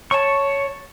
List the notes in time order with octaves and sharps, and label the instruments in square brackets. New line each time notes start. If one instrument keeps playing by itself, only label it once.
[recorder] C#5 [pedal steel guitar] A5 C#6